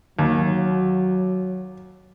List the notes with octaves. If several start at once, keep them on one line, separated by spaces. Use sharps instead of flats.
D#2 F#3